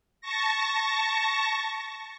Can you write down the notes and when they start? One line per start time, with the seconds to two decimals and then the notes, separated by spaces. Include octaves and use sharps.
0.21 A5 C#6 A#6